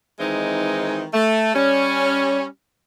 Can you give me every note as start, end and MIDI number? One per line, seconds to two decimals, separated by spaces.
0.20 1.05 51
0.20 1.05 52
0.20 1.05 56
0.20 1.05 60
0.20 1.05 63
1.14 1.52 57
1.54 2.45 55
1.54 2.45 61